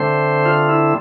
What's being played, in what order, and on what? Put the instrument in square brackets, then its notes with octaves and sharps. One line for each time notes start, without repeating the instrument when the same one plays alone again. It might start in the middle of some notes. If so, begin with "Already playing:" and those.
Already playing: [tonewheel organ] D3 A3 C4 C5
F4
E4